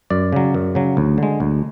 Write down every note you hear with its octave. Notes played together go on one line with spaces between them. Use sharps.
F#2 D5
C#3 F#3
F#2
C#3 F#3
D2
D3 G#3
D2